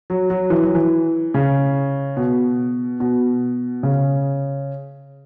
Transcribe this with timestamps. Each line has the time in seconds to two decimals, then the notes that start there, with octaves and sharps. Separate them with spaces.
0.10 F#3
0.30 F#3
0.50 E3
0.62 F#3
0.75 E3
1.34 C#3
2.17 B2
3.00 B2
3.83 C#3